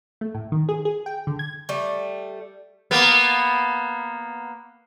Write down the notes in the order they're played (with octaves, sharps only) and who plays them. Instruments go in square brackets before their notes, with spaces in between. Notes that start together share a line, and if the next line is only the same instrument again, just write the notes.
[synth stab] A3
A2
D#3
G#4
G#4
G5
D3
G#6
[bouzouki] G3 A3
[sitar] A#3 B3